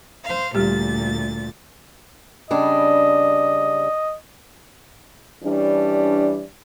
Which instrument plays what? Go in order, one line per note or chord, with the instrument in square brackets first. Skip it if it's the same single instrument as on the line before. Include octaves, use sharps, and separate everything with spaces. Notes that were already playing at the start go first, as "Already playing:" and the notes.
[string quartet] C5 F5
[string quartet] D2 A#2 A6 [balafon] G3 G4
[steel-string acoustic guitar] C#3 G3 D4 [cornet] D#5
[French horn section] E3 G3 C#4 D4